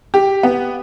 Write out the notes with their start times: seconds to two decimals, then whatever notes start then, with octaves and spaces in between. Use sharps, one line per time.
0.14 G4
0.43 B3